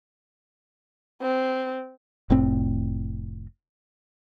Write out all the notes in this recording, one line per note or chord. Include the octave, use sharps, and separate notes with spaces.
C4
F1 A2 C4